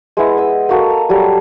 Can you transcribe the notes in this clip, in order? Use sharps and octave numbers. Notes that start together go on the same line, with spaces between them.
G#3 B3 E4
D#5 E6
A#3 F#4 A4
A#5
F#3 G3 A4 A#5